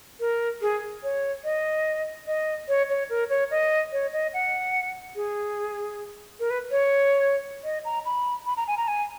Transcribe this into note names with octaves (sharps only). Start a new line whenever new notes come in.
A#4
G#4
C#5
D#5
D#5
C#5
C#5
A#4
C#5
D#5
C#5
D#5
F#5
G#4
A#4
B4
C#5
D#5
A#5
B5
B5
A#5
G#5
A#5
G#5